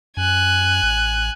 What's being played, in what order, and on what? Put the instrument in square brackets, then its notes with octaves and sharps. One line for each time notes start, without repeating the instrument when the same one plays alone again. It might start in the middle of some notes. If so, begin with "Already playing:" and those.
[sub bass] F#2 [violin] G#5 F#6
[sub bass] A1